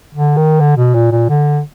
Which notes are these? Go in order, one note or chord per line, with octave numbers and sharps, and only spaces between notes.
D3
D#3
D3
B2
A#2
A#2
D3